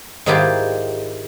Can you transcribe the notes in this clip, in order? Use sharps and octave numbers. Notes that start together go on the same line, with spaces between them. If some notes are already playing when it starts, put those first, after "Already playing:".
G#2 D#3 G#3 E4 F4 G4